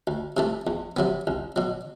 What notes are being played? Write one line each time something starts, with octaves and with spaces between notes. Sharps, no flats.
D2
C3 E3 A3
E2
C3 F#3 B3
C2
B2 F#3